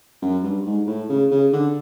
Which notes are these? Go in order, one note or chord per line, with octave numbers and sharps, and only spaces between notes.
F#2
G2
G#2
A2
C#3
C#3
D3